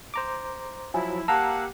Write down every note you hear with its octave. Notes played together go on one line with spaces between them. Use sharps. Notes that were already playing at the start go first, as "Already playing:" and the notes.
C5 A#5 D6
F3 F#3 E4 G#5
A#3 G4 F5 F#5 A5 A#5 E6